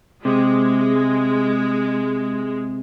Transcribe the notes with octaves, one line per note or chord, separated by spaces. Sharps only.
C3 G#3